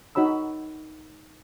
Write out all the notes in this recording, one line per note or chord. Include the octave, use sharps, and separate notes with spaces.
D#4 F#4 C#5 B5 E6